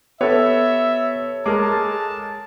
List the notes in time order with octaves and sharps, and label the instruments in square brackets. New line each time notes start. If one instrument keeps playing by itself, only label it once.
[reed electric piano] B3 G4 B4 [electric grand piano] A4 C#5 [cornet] E5
[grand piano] G#3 A#4 [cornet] A5 [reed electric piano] D6